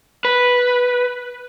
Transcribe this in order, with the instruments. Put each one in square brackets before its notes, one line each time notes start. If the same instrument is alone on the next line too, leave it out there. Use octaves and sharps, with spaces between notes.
[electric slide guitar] B4